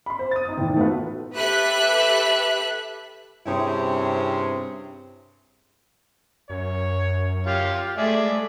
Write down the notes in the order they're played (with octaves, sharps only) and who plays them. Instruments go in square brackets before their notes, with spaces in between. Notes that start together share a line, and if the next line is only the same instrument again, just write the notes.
[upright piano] B5 C6
C5
D#6 A6
D#4 D#6
E2 A2 D#3 G5
A3 B3 F4 F#4 B4
[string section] G4 A4 B4 E5 B5 F#6
[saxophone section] G2 C3 C4 C#4 E4 G#4
[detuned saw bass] F#2 [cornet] C#5
[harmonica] F4 C#5 F5 [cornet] G4
[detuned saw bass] G#3 [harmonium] A3 [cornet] G#4 [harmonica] D5 E5